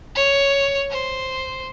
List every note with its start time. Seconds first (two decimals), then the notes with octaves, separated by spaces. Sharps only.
0.15 C#5
0.91 C5